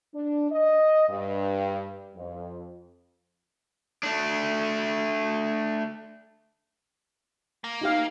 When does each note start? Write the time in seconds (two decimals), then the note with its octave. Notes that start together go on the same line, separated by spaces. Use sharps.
0.14 D4
0.51 D#5
1.08 G2
2.16 F2
4.03 A3 D4
7.64 A#3
7.81 D#4 G4 F5